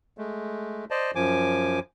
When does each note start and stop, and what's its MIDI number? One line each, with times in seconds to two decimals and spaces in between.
0.18 0.85 56
0.18 0.85 57
0.91 1.11 72
0.91 1.11 74
0.91 1.11 75
0.91 1.11 81
1.15 1.80 42
1.15 1.80 53
1.15 1.80 80
1.15 1.80 86